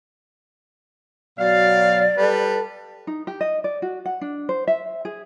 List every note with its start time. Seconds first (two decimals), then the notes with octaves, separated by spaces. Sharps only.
1.38 B2 F#3 D5 F5
2.18 G3 A4 B4
3.07 D#4
3.27 G4
3.41 D#5
3.64 D5
3.82 F#4
4.06 F#5
4.21 D4
4.49 C5
4.67 E5
5.05 G#4